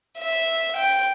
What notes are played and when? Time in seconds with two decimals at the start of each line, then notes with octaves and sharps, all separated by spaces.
0.19 E5
0.77 G5